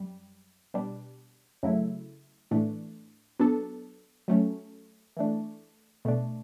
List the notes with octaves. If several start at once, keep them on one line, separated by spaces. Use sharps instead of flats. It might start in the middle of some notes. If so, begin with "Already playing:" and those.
Already playing: F#2 G3
B2 G3 D4
F#2 C#3 F#3 A3 E4
A2 E3 A3 D4
F#3 B3 D4 A4
F#3 A3 C#4
E3 A3 D4
B2 A3 D4